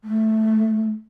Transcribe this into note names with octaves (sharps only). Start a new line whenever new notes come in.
A3